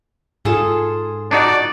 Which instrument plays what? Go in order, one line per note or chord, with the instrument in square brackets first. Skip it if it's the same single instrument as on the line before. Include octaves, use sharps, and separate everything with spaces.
[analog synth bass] G#2 [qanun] F4 G#4 A4
[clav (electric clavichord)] D4 D#4 F#4 [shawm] D5